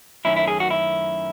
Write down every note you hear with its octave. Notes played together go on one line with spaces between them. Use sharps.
F#2 D#3 A3 C#4 E4
E4
G#4
F#4
E4